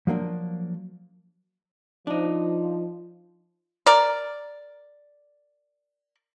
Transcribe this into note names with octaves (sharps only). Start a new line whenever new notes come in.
F3 F#3 A#3 D4
F3 D4 D#4
A#4 D5